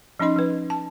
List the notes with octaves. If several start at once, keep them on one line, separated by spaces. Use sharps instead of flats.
F3 C#4 D#4 D#5 C6
F3 B4
A5